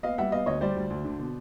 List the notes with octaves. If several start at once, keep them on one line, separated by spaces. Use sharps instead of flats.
B3 D#5 F5
G3 E5 F#5
B3 D#5 F5
D2 C#5 D#5
G3 C5 D5
D2
D2
D3
B2